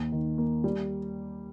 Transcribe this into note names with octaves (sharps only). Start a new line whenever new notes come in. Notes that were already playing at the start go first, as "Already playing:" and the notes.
Already playing: D#2
D#3
A#3
G3